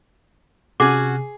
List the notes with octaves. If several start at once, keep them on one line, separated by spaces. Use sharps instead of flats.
C3 C#4 F#4 G#4 D6